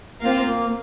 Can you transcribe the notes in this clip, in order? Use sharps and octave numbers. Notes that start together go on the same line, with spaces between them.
A#3 C4 F4 A#4 F5
A#3